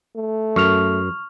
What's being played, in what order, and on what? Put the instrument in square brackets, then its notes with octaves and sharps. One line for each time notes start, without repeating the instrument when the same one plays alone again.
[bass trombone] A3
[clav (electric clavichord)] F#2 [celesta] C#6 F6 F7